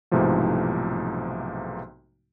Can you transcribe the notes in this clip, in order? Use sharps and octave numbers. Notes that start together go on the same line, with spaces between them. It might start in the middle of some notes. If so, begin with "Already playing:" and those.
B1 G#2 C3 E3 F3 A3